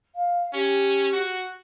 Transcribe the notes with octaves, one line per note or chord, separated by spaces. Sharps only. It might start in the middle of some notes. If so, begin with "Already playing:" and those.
F5
C#4 G4
F#4